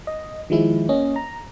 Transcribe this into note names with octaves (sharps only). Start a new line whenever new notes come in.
D#5
D#3 F3 G#3 E4
A#3 C#4 D#5
A#5